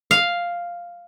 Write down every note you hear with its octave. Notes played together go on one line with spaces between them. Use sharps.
F5